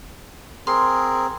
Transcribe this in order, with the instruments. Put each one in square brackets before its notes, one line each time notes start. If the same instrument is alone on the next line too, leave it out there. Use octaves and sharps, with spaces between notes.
[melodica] C4 G#4 A#4 [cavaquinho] C6